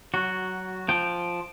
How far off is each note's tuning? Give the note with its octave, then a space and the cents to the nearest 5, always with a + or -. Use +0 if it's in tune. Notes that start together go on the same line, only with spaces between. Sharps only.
F#3 +15 F#4 +0
F3 +0 G5 +0